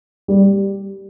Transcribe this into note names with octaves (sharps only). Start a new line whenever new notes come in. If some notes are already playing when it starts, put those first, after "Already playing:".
G3